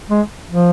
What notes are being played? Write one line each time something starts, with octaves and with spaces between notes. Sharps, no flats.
G#3
F3